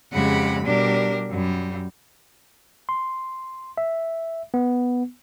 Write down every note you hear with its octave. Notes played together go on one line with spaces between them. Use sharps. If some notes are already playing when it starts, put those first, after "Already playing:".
F2 C#3 G#3 G4 F#5 B5
B2 G3 D4 G4 A#4
F#2 G3
C6
E5
B3